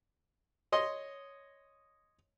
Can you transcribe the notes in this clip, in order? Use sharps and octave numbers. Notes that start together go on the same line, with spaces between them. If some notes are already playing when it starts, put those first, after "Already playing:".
C#5 D#5 C6